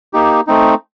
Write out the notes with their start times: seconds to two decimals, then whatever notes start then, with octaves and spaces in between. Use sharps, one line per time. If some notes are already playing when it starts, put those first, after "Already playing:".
0.13 A#3 D#4 G4
0.47 A3 C4 D#4